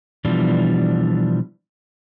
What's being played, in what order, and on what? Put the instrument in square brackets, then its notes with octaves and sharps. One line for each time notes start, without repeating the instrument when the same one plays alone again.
[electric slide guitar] B2 E3 F3 G3 D4